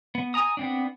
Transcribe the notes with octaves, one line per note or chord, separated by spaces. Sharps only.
B3
G#5 A#5 D#6
B3 C4 D4